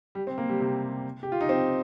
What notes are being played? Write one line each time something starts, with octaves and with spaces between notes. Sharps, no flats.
G3
C4
A#3
G3
C3
G4
F4
D#4
C4